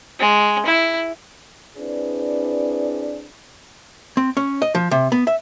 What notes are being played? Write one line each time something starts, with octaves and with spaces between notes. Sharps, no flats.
G#3
E4
C4 D4 E4 G#4 B4 D5
C4
C#4
D#5
F3
C3
B3
E5